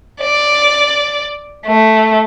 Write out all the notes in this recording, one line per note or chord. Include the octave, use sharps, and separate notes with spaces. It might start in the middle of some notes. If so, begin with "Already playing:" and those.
D5
A3